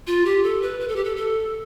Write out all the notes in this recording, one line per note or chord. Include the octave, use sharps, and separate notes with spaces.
F4
G4
A4
B4
B4
A4
G4
A4
A4